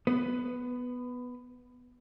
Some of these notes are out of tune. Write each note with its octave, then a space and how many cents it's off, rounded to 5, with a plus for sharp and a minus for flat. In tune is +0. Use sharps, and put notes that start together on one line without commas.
B3 +0 B4 +20